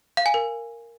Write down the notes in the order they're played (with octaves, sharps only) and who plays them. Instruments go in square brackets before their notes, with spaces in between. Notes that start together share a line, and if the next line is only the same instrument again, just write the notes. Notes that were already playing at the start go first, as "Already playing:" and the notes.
[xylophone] F5
G#5
A#4